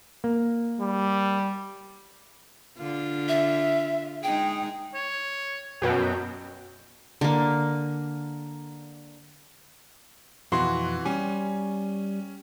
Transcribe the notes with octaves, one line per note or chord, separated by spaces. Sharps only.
A#3
G3
D3 F4
E5
G#3 D#4 G#4 G5
C#5
F#2 B2 F#3 G5
D3 A#3
F2 B2 E3 F#4 C6
G3 C#4 G#5